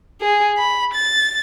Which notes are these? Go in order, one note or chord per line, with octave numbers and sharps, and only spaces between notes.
G#4
B5
A6